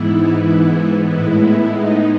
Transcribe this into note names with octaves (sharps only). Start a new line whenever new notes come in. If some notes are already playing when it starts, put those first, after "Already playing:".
Already playing: G#2 E3 B3 E4
A2 G#3 B3 E4
D#4